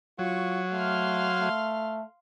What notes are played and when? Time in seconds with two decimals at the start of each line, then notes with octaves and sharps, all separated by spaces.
0.19 F#3 F4 C#6
0.72 A3 F5 C6 F6
1.41 A3